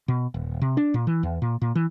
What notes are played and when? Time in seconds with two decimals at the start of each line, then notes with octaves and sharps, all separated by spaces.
0.08 B2
0.34 D#1
0.62 C3
0.77 D4
0.94 A#2
1.07 E3
1.23 E2
1.42 A#2
1.62 A#2
1.75 E3